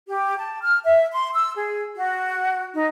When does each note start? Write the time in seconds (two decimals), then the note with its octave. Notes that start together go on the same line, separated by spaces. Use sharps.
0.08 G4
0.38 A5
0.62 F6
0.85 E5
1.12 C6
1.34 E6
1.56 G#4
1.96 F#4
2.73 D#4